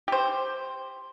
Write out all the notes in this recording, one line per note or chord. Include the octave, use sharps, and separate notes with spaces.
G4 C5